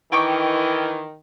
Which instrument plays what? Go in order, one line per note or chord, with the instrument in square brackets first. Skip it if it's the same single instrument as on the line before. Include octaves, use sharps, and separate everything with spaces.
[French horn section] D#3 [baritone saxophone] E3 [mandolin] G5 C#6 D6